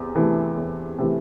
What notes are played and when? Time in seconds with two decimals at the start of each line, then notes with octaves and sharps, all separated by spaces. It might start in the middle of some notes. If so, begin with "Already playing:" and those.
Already playing: E2 C3
0.15 C3 E3 A3
0.57 E2
0.99 C3 E3 A3